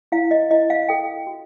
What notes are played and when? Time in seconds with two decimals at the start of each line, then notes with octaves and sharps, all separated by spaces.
0.12 E4 F5
0.31 D#5
0.51 E4 D#5
0.70 F5
0.89 A4 G5
1.27 F#4